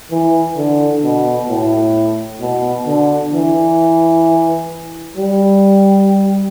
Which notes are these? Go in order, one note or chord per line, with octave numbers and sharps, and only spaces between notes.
E3
D3
B2
A2
B2
D3
E3
G3